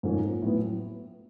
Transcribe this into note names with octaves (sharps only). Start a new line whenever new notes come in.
G#2 F3 A#3 C#4
A2 F#3 B3